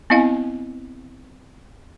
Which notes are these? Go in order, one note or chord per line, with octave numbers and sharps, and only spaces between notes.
B3 C4 E4 D#5 F5 G#5